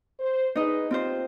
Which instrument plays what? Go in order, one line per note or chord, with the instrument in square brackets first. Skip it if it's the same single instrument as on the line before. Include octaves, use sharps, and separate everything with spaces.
[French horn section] C5
[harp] D#4 D#5 [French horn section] G#4 B4
[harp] C4 F4 C5 [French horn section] G4